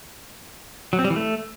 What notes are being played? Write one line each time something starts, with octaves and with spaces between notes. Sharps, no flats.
F#3
C4
G3
E3
A3